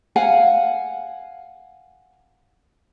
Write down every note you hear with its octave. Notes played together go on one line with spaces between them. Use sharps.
F5 F#5 G#5